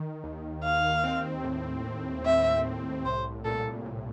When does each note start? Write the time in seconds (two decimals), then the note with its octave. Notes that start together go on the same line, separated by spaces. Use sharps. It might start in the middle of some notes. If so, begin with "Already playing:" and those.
Already playing: D#3
0.24 D#2
0.64 D#2 F5
1.04 C4
1.44 A2
1.84 A2
2.25 A2 E5
2.65 A2
3.05 C2 C5
3.44 A#2 A4
3.85 A#2